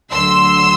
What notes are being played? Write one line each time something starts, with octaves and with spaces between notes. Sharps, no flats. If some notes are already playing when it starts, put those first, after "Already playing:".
D2 D3 F#3 C6 E6